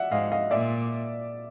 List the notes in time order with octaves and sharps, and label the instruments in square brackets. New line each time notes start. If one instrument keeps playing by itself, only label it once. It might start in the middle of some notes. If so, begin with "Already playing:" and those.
Already playing: [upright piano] D5 E5 F#5
[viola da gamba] G#2 [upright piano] D#5 F5
[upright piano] D#5 F5
[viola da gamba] A#2 [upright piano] D5 E5